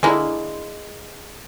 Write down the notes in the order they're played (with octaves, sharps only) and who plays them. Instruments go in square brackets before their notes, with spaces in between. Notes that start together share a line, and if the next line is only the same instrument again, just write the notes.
[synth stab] D3 D4 E4 [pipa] G#3 A#3